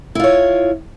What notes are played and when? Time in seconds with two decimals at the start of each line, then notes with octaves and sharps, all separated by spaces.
0.15 E4
0.20 F4
0.24 C#5